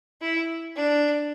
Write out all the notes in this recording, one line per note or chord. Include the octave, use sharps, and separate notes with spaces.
E4
D4